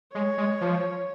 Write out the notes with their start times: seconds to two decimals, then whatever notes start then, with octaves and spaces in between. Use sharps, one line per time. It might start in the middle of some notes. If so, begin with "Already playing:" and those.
0.14 G#3 C#5
0.38 G#3
0.61 F3